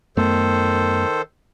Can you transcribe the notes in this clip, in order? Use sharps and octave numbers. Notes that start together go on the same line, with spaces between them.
F#2 D#3 A3 B3 A4 C5